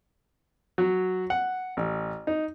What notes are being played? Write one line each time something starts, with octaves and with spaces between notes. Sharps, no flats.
F#3
F#5
A1
D#4